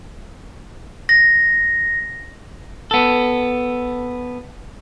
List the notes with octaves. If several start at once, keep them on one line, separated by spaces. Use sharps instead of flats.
A#6
B3 A4